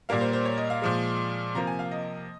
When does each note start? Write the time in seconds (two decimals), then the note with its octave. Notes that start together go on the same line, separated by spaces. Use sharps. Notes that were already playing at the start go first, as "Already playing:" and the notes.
0.09 A#2 G3 A#3 F5
0.21 C5
0.33 C5
0.45 C#5
0.58 D#5
0.70 F5
0.82 A#2 F3 G#3
1.55 C3 F3 A#3 A#5
1.67 G#5
1.79 F5
1.91 D#5